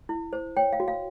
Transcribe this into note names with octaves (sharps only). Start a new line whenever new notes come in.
E4
C5
C#5 G5
F5
F#4
F5